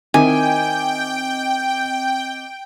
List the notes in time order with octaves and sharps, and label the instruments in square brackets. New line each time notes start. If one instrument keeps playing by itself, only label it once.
[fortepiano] D#3 E4 [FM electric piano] C4 D#5 D6 [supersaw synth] G5 [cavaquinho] G#5